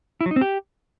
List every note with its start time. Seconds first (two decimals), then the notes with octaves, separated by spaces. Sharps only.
0.21 E4
0.26 F#3
0.31 D#4
0.36 C4
0.41 G4